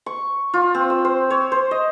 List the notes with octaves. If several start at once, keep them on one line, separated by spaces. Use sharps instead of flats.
C#6
F4
C4
E6
C5
C#5
C5
D#5